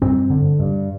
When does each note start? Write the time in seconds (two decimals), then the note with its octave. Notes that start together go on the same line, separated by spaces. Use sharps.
0.02 G2 C4
0.30 D3
0.59 G2